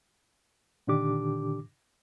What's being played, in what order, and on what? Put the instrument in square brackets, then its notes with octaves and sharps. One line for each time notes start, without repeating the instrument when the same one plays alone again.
[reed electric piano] A#2 D3 D#3 D4 G4 D6